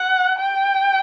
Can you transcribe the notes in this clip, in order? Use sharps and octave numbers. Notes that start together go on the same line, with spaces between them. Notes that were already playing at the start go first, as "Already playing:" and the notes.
Already playing: F#5
G5